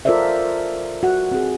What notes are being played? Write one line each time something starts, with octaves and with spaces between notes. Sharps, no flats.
F4 A4 A#4 C5 D5 E5
F#4 F#5
C4 G#4